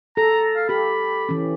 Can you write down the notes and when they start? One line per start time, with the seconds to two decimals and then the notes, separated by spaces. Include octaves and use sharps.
0.17 A4 A#5
0.56 F5
0.69 G4 A4 B5
1.29 E3 C#4